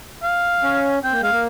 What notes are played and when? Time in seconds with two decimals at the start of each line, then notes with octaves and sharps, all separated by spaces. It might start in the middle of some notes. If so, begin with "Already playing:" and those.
0.23 F5
0.63 C#4
1.03 C4 G5
1.12 A#3
1.21 G#3 F5
1.31 A#3